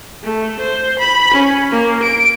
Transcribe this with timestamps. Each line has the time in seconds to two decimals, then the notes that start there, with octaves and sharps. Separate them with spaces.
0.23 A3
0.60 C5
0.99 B5
1.34 C#4
1.72 A#3
2.03 D7